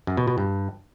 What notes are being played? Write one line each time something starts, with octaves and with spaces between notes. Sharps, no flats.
F#2
B2
B2
G2